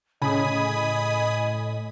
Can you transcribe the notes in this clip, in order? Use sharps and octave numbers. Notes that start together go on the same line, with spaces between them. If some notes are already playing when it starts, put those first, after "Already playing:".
A2 C#3 D#5 G#5 B5 D#6